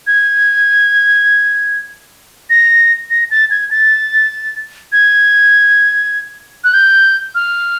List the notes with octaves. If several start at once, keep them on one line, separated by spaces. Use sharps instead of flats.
G#6
A#6
A#6
A6
G#6
A6
G#6
F#6
G6
F6